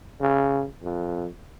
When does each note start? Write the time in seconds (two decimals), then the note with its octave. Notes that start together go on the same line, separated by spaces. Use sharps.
0.21 C#3
0.83 F2